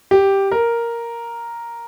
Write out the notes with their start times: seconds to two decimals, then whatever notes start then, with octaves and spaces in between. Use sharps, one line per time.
0.11 G4
0.52 A#4